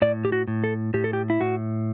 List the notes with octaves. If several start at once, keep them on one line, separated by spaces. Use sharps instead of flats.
A2 D5
G4
F#4
A2
A4
A2 G4
A4
G4
E4
A2 F#4